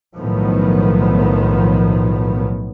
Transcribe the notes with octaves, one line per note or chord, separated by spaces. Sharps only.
B1 A2 D#3 F3 F#3 B3